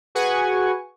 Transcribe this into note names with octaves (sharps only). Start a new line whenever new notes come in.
F#4 G#4 B4 F#5 G#5 C#6